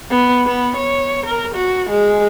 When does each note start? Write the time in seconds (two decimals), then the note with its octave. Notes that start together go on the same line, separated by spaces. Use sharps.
0.11 B3
0.45 B3
0.77 C#5
1.26 A#4
1.55 F#4
1.90 G#3